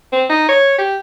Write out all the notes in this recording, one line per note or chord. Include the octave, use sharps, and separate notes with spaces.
C4
D#4
C#5
G4